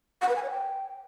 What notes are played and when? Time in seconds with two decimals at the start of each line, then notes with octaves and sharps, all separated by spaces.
0.22 F#5
0.29 B4
0.36 G#5
0.43 C#5
0.50 G5